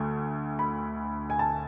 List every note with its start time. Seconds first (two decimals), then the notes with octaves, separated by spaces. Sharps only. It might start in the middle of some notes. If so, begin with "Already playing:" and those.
Already playing: D2 A3
0.59 B5
1.30 G#5
1.39 A5